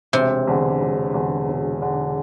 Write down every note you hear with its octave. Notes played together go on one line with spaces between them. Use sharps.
E1 C3
E2 D3
E1
E2 D3
E1
E2 D3